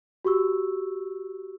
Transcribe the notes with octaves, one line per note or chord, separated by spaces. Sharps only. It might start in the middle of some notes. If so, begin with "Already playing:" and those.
F#4 G4 C#6 E6